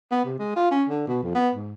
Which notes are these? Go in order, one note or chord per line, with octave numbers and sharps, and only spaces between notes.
B3
C3
G#3
F4
C#4
D3
B2
F2
B3
G#2